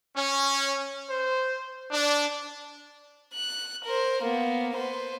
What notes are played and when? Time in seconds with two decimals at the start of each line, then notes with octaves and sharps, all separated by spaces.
0.15 C#4
1.09 C5
1.91 D4
3.34 F#6
3.85 A#4 C5
4.23 A#3 B3
4.76 B4 C5